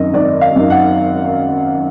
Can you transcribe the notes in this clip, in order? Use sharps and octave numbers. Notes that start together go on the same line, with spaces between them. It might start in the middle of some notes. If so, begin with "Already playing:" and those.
Already playing: G#1 F#2 D#3 D#5
G#1 D5
F5
F#2 D#3
F#5